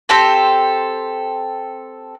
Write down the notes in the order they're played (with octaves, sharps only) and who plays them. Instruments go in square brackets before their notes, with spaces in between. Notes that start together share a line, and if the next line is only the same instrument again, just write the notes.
[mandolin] C4 G4 A4 C5